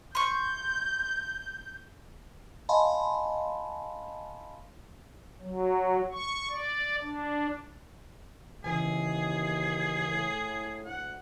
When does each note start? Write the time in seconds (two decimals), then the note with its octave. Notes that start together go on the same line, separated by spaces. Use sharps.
0.15 C6 C#6 G6
2.69 D#5 F5 G#5 A5 B5 C6
5.42 F#3
6.12 C#6
6.50 D5
7.02 D4
8.64 D#2 C#3 E3 G#4 G#5
10.09 A2
10.85 D2 F#5